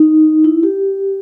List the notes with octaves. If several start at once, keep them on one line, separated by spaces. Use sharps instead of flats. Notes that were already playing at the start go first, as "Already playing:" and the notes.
Already playing: D#4
E4
G4